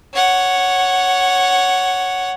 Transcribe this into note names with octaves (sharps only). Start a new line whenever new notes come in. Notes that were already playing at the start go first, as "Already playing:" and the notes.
C#5 F#5